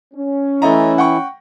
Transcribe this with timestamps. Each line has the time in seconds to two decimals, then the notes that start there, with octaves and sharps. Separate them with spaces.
0.14 C#4
0.62 E3 A3 E4 D#5 A#5
0.98 F#5 G5 C#6